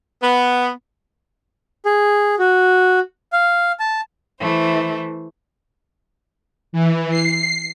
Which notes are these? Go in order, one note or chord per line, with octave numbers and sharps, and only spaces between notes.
B3
G#4
F#4
F5
A5
E3 A3 C5
E3
C7